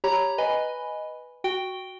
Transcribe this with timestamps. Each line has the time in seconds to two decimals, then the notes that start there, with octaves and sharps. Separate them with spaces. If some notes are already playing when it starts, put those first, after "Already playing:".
0.04 G4 C#5 A#5 B5
0.38 B4 D#5 G#5 B5
1.44 F#4 G5 D7 G7